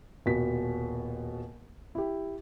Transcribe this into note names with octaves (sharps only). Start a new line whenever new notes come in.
D#1 B2 B6
E4 G4